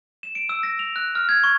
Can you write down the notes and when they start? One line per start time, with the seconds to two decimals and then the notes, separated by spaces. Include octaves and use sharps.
0.23 E7
0.35 D7
0.49 E6
0.63 A#6
0.79 F7
0.96 F#6
1.15 F6
1.29 G#6
1.44 C#6